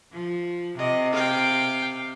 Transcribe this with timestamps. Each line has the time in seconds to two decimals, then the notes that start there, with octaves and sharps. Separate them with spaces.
0.13 F3
0.79 C3 D#5
1.13 F5 G5